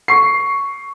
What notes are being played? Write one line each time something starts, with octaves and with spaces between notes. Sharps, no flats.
C#6 C7